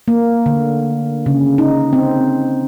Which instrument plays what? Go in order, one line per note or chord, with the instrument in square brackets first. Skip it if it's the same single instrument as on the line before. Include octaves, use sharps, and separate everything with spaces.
[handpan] A#3
D3
C#3
D#4
C4